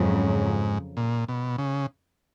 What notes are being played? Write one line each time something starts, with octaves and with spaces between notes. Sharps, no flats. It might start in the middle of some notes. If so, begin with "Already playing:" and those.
Already playing: F2 G#2 C#3 F#3
A#2
B2
C#3